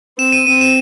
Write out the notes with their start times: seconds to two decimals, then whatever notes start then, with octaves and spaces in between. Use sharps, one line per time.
0.18 C4 E7
0.32 D#7
0.47 C4 D#7
0.61 E7